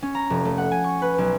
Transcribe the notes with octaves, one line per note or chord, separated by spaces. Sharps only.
C#4
A#5
F1
A3
F#5
G#5
C#6
B4
B1